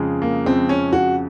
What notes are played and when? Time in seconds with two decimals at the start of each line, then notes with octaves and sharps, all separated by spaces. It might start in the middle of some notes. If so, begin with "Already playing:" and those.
Already playing: F2 C#3 G#3
0.22 A#3
0.45 F2 C#3 G#3 C4
0.69 C#4
0.93 F#4